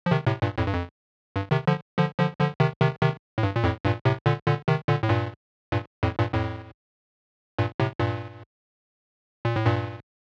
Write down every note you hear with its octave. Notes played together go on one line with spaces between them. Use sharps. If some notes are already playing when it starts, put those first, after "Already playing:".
F3
C3 D#3
A2 C3
G2 A#2
F2 A2
G2
F2
G2
C3 D#3
D3 F3
D3 F3
D3 F3
D3 F3
C3 D#3
C3 D#3
C3 D#3
A2
G2
A#2
F2 A2
G2 A#2
A2 C3
A#2 D3
A#2 D3
C3 D#3
A#2 D3
A2
G2 A#2
G2 A#2
F2 A2
G2 A#2
F2 A2
G2 A#2
A2 C3
G2 A#2
A#2
A2
G2 A#2